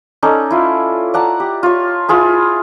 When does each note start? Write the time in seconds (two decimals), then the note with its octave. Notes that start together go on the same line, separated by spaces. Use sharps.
0.23 C#4 D#4 A4 D5
0.51 E4 F4
1.14 D5 F#5 A5 A#5
1.40 G4
1.63 F4 C#5
2.08 E4 F4 G#4 B4